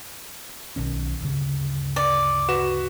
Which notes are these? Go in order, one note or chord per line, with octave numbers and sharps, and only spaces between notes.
B1 D#3 C#4
D2 G2 C#3
D5
F#4 B4 E7